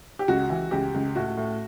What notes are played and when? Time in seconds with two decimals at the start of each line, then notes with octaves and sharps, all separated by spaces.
0.19 G4
0.28 C#2 F#4
0.50 E3
0.71 C#2 G4
0.94 C#2
1.15 A2 F#4
1.37 A2